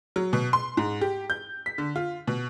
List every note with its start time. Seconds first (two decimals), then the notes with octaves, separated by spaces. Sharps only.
0.16 F#3
0.33 B2
0.53 C6
0.77 G#2
1.01 G4
1.30 G6
1.66 B6
1.78 D3
1.96 F4
2.28 B2